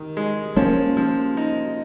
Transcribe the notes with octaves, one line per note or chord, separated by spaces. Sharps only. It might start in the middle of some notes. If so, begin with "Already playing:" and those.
Already playing: D#3
G#3
F3 A#3 C#4
F3
D#4